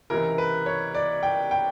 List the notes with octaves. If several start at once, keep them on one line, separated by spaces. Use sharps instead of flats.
C#2 C3 E3 A#4
B4
C#5
D5
G5
G5